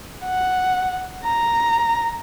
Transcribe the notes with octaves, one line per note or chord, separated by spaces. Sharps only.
F#5
A#5